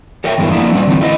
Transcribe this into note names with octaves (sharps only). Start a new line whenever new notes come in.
A4 A#4 C#5 E5 G5
E2 G2 G#3 A#3 B3 E4
F3 A#3 D4 E4
G3 C#4 D5
D3 E3 G3 G#3 C4 D#4
A3 E4 D#5